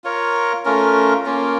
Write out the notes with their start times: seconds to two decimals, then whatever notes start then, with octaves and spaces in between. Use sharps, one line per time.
0.04 F4 A#4 C#5
0.65 A3 C#4 F4 A#4
1.25 A#3 C#4 F4